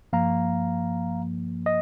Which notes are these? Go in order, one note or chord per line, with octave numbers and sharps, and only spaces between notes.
G2 F3 A#3 F5 A#5
D#5